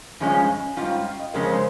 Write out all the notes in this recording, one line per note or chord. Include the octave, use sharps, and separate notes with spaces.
G2 F3 G#3 C#4 G#5
G#2 G3 C#4 F4 G5
F5
D#5
F2 C#3 G#3 C#4 A#4
C5